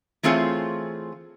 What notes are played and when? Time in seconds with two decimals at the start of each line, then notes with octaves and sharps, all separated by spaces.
0.23 E3 A3 C4 F4 G#4 C#5